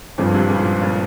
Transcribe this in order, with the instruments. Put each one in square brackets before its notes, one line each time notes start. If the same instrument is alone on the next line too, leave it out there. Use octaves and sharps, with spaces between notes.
[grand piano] G2 F3 C4 [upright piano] A#2 C#3
[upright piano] G#2 C3
A#2 C#3
A#2 C#3